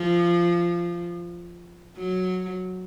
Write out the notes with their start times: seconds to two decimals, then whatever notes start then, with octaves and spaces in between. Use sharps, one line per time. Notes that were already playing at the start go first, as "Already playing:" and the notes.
Already playing: F3
1.98 F#3